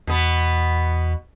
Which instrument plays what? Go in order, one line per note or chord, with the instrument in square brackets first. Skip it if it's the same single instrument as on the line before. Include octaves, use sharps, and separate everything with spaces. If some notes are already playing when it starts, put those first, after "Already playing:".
[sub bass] E2 [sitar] B2 B3